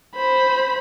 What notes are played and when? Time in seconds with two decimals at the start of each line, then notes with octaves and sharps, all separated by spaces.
0.15 C5 B5